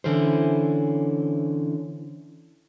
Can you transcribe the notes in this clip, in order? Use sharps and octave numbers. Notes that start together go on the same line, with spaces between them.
D3 E3 C#4 E4 C5